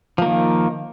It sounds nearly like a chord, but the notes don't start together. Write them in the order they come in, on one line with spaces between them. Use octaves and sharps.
F3 A#3 D#3